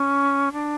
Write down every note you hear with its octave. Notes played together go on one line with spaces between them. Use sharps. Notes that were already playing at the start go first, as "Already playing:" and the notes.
Already playing: C#4
D4